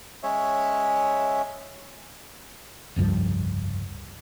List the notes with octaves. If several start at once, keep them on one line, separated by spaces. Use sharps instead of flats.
G#3 C#4 C#5 E5
F1 C#2 G2 F3